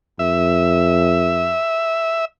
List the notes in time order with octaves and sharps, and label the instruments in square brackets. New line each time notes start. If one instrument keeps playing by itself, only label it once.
[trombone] F2 [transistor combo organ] E5